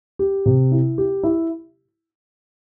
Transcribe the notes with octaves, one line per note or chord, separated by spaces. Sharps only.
G4
C3
E4
G4
E4